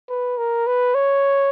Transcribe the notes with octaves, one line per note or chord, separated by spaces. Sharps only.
B4
A#4
B4
C#5